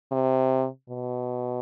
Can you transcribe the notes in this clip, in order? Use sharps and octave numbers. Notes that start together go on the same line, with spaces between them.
C3
B2